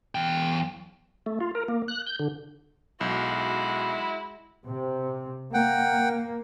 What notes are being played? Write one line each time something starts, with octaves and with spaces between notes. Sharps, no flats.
E2 G5
A3
F4
A#4
A#3
F#6
G6
D3
B1 G#3 E4 F#4
C3
A#3 F#5 G5